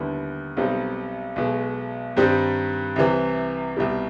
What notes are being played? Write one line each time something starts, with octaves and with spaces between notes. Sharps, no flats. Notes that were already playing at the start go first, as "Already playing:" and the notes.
Already playing: D#2 D3 G3 B3 E4
B1 B2 G3 C4 D#4
B1 B2 G#3
G2 D#3 G3 C4 D#4
C2 C3 E3
C2 B2 G3